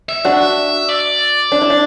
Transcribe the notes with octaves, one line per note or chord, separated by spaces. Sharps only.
E5
D4 F#4
D5
D4
E4
D4